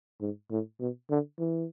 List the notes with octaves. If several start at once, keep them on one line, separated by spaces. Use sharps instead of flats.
G#2
A2
B2
D3
E3